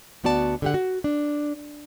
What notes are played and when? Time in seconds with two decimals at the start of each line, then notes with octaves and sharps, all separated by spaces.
0.24 D2 B3 F#4 D5 A5
0.62 D3 G4 F#5
0.74 F#4
1.04 D4